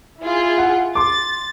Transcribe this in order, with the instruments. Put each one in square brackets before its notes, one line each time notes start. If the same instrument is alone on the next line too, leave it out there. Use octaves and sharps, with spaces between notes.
[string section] E4 F4 G#4
[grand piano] F#5
[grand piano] C6 D6 [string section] A6